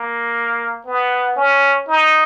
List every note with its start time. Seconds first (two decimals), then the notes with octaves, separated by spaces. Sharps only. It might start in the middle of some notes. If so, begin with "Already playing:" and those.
Already playing: A#3
0.87 B3
1.36 C#4
1.87 D#4